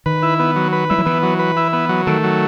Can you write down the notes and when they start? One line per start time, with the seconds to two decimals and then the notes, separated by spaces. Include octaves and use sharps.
0.06 D#3 B4
0.23 E4
0.39 B3
0.56 F#3
0.73 B4
0.90 G3 E4
0.98 F#3
1.06 E3 B3
1.23 F#3
1.39 B4
1.57 E4
1.73 B3
1.89 F#3
2.07 D#3 A3
2.23 F#3